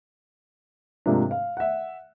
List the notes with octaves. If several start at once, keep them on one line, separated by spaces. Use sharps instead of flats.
G#2 C3 F3 A#3 D4
F5
E5 F#5